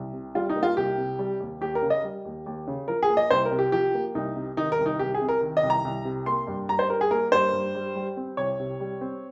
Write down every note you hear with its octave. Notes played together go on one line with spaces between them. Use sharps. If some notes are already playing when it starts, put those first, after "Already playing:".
Already playing: C2
C3
G3 F4
D#4
A#3
F4
C2 G4
C3
G3
D#2
D#2 G4
A#4
C#3
D#5
G3
D#2
D#2
C#3
F3 A#4
G#4
A#3
D#5
C2 C5
A#4
C3
G4
F3 G4
A#3
C2 D#4
C3
D#3 D#4
A#4
C2
D#4
C2 G4
G#4
C3
A#4
D#3
D#5
C2
A#5
C2
C3
A#3 C6
G2
G2 A#5
C5
G3 A#4
G#4
A#3 A#4
G2 C5
G2
G3
G3
C4
C2 C#5
C3
G3
C4